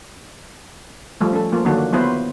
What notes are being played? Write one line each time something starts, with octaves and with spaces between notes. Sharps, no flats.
F3 G3 A3
C#4 A4
F3 A#3 F4
D3 D#3 F#3 A#3 D4 F#4
F#3 B3 E4 F4 B4 C5